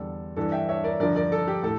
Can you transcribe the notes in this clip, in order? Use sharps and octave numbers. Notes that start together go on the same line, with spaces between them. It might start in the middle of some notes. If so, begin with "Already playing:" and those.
Already playing: E2 D3 G3 A4
G2 E3 G3 A4
E5 G5
C#5 E5
A#4 D5
G2 D3 F3 A#4 D5
A#4 D5
A4
G4
A2 A4